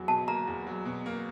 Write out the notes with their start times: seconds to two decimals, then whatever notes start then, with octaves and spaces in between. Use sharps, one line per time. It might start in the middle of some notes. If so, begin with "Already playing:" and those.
Already playing: E2 F#3
0.08 B2 A5
0.27 A#3 A#5
0.47 E2
0.67 F#3
0.85 B2
1.06 A#3